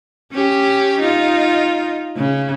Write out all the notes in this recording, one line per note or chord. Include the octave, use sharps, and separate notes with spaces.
C#4 G4
D#4 F4
C#3